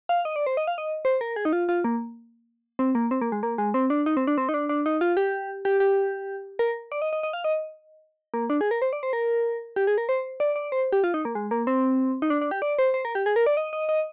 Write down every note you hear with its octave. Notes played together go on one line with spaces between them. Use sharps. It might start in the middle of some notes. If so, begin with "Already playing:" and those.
F5
D#5
D5
C5
D#5
F5
D#5
C5
A#4
G#4
D#4
F4
F4
A#3
C4
A#3
C4
A#3
G#3
A#3
G#3
C4
D4
D#4
C4
D4
C4
D#4
D4
D4
D#4
F4
G4
G4
G4
A#4
D5
D#5
D#5
D#5
F5
D#5
A#3
D4
G#4
A#4
C5
D5
C5
A#4
G4
G#4
A#4
C5
D5
D5
C5
G4
F4
D#4
A#3
G#3
A#3
C4
D#4
D4
D4
G4
D5
C5
C5
A#4
G4
G#4
A#4
D5
D#5
D#5
D#5